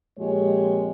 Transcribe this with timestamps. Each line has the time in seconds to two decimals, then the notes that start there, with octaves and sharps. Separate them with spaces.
0.19 F2 A#2 F3 G#3 G4 C#5